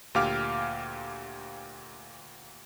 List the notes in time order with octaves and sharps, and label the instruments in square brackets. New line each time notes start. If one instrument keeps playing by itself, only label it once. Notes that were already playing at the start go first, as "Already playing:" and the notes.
[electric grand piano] D2 A#2 G4 F5 D6 F6